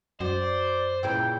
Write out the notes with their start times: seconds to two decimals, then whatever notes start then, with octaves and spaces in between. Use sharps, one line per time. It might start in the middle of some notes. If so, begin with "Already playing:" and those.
0.21 F#2 F#4 C5 D5
1.03 A#2 C#3 E3 G5